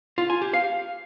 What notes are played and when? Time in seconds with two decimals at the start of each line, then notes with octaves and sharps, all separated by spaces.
0.18 F4
0.30 G#5
0.42 G4
0.54 F5